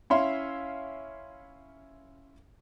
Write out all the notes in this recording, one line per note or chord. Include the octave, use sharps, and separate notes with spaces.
C#4 E4 C#5 E5 F5 C6